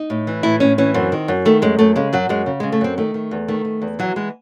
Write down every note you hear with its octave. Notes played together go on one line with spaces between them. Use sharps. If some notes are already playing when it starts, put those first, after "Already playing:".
Already playing: D#4
A2
E3
A2 E4
A2 C#4
E3 C#4
F#2 C4
D#3
F#2
D#3 A3
F#2 G#3
F#2 A3
C#3 G#3
F#2 F#3
F#2 G#3
C#3
C#3 G#3
A3
F#2 C4
D#3 A3
D#3
E2
D#3 A3
D#3
E2
E3 F#3
E3 G#3